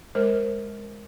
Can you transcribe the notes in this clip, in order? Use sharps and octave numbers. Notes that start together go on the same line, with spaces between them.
G#3 A#4 C5